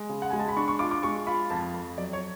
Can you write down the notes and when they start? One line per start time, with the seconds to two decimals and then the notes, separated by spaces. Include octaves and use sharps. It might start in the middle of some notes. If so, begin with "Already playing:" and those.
Already playing: G#3
0.09 C#3
0.22 F#5
0.30 G#3 G#5
0.39 A5
0.48 B5
0.57 D4 C#6
0.68 C#6
0.79 F4 D6
0.91 D6
1.03 G#3 C#6
1.27 F4 B5
1.50 F2 A5
1.74 F2
1.98 F#3 D5
2.13 C#5